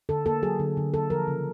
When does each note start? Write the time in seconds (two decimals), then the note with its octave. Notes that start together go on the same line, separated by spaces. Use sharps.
0.09 D3 A4
0.26 A#3 A4
0.42 F#3 G#4
0.59 D3
0.77 D3
0.93 A#3 A4
1.10 F3 A#4
1.27 C#3